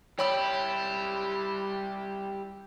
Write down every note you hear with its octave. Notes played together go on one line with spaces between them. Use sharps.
G3 E4 G4 C#5 D5 B5 E6